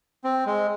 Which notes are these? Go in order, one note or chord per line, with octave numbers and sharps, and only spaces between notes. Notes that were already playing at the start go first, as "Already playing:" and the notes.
C4
G#3